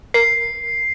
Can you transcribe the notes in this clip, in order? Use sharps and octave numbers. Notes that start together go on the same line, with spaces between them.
A#4 C7